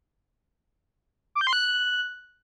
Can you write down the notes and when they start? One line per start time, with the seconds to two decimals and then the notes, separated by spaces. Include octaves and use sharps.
1.35 D6
1.41 G6
1.47 C6
1.53 F#6